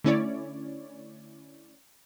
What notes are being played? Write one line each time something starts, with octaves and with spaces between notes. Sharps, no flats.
D3 A3 C#4 E4 C#5 D5